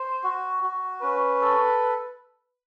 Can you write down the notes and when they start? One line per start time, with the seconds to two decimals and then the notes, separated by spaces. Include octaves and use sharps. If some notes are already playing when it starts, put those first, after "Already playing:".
Already playing: C5
0.24 F#4
0.63 F#4
1.02 C#4 B4
1.42 A4